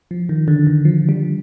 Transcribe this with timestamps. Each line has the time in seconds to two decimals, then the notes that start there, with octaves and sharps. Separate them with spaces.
0.11 F3
0.29 D#3
0.48 D3
0.67 D#3
0.85 F3
1.09 G3